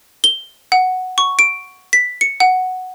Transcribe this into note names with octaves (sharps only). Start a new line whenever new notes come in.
G7
F#5
C#6
D7
B6
C#7
F#5